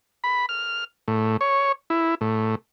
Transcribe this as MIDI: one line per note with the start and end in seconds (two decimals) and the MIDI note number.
0.24 0.46 83
0.49 0.84 89
1.08 1.37 45
1.41 1.72 73
1.90 2.15 64
2.21 2.55 45